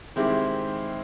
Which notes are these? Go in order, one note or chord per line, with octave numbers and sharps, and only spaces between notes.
D#3 G#3 C4 E4 G4